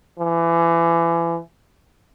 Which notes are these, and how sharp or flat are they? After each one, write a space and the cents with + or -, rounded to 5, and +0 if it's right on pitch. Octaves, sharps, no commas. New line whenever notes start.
E3 +30